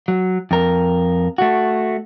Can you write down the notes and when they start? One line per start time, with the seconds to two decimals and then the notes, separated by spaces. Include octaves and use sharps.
0.08 F#3
0.51 F2 A#4
1.38 A3 F#4